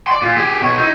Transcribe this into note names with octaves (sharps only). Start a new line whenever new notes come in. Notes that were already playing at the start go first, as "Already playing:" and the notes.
D5 C6
A#2 F4
G4 G#4
B2 C#5
D#4 E4